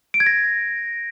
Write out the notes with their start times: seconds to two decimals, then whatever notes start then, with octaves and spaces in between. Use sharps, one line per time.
0.14 D7
0.20 G#6
0.26 A#6